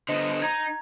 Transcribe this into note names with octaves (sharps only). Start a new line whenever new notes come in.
D3 B3 C5 D#5
D#4 A#5 G#6